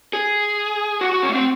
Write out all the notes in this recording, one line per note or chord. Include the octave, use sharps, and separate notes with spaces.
G#4
F#4
F#4
C#4
A3
C4